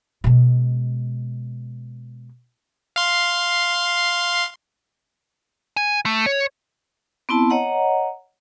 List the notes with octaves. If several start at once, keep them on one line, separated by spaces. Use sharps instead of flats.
B2 G#3
F5 C6
G#5
A3
C#5
B3 C4 E4 A5
C#5 D#5 F#5 A#5